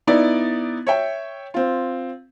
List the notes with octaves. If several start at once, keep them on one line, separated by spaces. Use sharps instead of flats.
B3 D#4 E4 D5
C#5 E5 G5
C4 F4